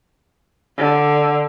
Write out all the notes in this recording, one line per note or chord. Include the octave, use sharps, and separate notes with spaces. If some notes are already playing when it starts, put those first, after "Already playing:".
D3